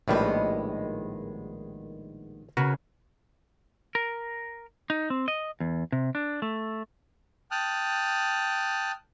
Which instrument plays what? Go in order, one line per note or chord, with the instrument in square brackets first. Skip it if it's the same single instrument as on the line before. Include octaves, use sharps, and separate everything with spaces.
[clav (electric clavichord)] A#1 A2 G3 [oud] D#3 G#3 B3
[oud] C#3 [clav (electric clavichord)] F#4 A#4 B4
[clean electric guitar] A#4
D#4
C4
D#5
E2
C3
D4
A3
[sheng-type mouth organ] G5 A5 D#6 F6 F#6